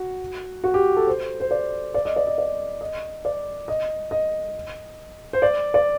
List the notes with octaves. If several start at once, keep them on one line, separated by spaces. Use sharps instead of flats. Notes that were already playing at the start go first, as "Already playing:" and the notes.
Already playing: F#4
F#4
G4
A4
C5
C5
D5
D5
D#5
D5
D#5
D5
D#5
D5
D#5
D#5
C5
D5
D5